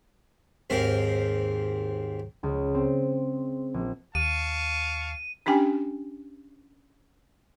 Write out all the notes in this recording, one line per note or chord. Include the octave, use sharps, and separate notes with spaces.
D#2 G#2 C4 A#4
C#2
C4
A#1
D#2 F5 A5 C#6 D#7
C#4 D4 G4 G5 G#5